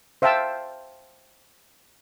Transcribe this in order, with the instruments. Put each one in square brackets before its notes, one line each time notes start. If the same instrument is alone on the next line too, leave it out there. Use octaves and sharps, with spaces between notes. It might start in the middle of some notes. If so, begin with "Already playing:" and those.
[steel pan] C5 E5 F5 G5 A5 E6